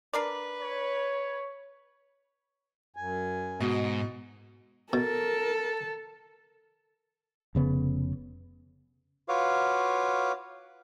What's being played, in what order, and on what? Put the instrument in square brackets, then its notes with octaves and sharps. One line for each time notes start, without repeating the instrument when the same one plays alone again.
[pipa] D4 A#4 D5 [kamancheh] B4
[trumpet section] C#5
[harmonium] F#2 G#5
[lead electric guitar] G#2 [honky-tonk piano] B2 [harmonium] D#5
[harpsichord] B2 [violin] A4 [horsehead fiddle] A#4 [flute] A6
[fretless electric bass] F1 C#3 B3
[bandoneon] F4 F#4 B4 C#5 F5 D6